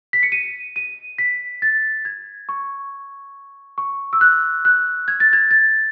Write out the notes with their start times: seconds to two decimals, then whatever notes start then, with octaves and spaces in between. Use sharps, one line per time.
0.13 B6
0.23 C#7
0.32 D#7
0.76 D#7
1.18 B6
1.62 A6
2.05 G#6
2.49 C#6
3.78 C#6
4.13 E6
4.21 F#6
4.65 F#6
5.08 G#6
5.20 A6
5.33 G#6
5.51 A6